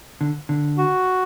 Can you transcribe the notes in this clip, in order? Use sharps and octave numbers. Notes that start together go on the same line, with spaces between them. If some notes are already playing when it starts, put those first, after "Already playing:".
D3
D3
F#4